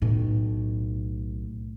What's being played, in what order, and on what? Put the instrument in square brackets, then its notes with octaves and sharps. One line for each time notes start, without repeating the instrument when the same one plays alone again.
[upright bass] B1 A2